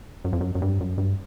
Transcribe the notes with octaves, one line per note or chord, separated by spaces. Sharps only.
F#2
F2
F#2
F#2
G2
F#2
G2